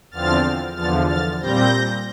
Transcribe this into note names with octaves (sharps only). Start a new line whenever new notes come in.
E2 D3 F3 C4 F6 A6
E2 D3 F3 F6 A6
F6 A6
A#2 G3 C4 G6 A#6